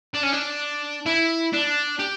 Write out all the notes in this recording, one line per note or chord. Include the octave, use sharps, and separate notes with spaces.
D4
C#4
D4
E4
D4
G4